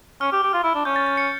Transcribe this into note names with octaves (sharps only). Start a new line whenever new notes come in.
C#4 F6
G4
G4
F4 F6
E4
D4
C#4 G6
A6
A6
A6 C#7